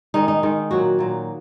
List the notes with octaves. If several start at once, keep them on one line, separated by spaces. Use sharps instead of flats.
D#3 G#3 D#4
D#4
D#3 G#3
A#2 F#3 A#3 F#4
A#2 F#3 A#3